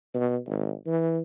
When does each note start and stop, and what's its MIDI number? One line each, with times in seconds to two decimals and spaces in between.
0.14 0.38 47
0.46 0.73 32
0.86 1.20 52